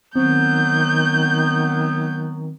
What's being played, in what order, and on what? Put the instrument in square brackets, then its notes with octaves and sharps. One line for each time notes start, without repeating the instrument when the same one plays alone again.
[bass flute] D#3 [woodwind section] F#3 B3 [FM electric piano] C4 [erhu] G6